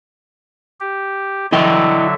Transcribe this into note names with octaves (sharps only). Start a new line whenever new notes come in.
G4
D3 F#3 E4 D#5 E5 G5